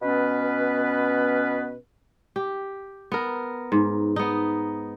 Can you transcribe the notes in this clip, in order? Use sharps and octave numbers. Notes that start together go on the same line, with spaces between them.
B2 B3 C#4 B4
G4
B3 A#4
G#2
B3 D#4